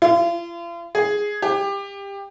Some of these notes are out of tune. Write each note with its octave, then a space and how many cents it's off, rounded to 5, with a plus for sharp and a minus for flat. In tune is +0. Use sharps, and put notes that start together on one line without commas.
F4 -40
G#4 +0
G4 +20